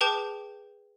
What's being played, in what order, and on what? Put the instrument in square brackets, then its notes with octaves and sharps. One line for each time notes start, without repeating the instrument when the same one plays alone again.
[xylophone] G#4 B4 G5 A5 D6 G6